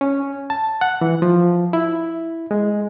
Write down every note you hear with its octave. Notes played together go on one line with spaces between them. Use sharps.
C#4
A5
F#5
E3
F3
E4
G#3